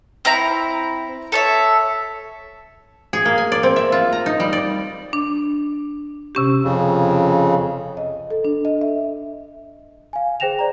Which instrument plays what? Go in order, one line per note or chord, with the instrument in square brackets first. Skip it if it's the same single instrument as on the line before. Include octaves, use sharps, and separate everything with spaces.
[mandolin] C4 E4 A#5 B5
A4 C#5 E5
[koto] G#4
A#3
G#5
D5
C4
E5
F4
A#5
D#4
G3
D5
[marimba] D4
C3 C#4 G4
[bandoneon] F2 C#3
[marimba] D#5
A4
D4
D#5
E5
[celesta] F5 G#5
G#4 C5 G5 A#6 E7 F7
C5 D5 A#5